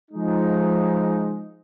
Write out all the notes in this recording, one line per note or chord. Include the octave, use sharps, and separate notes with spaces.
F3 G#3 D#4